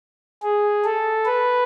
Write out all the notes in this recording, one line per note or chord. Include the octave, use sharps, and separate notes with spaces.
G#4
A4
B4